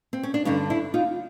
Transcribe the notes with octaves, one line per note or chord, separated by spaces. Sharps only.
C4
C#4
D4
G2 D3 C#4 D#4
D4 E4
D#4 F4